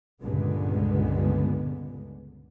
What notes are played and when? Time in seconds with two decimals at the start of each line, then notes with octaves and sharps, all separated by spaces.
0.23 C#2 G2 A#2 D3 G#3 B3